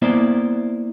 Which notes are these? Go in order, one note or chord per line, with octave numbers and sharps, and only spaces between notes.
A#3 B3 E4 C5 D5